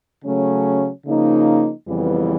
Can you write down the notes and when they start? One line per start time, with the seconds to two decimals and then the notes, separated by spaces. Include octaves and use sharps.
0.24 C#3 F#3 A3 C#4
1.05 C#3 F3 A#3 D#4
1.87 F2 C#3 E3 G3 B3